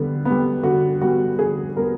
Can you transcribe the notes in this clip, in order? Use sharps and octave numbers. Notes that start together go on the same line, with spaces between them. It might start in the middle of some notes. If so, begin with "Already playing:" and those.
Already playing: D3 G3 B3
G3 B3
D3 F#4
G3 B3 F#4
D3 G#4
G3 B3 A#4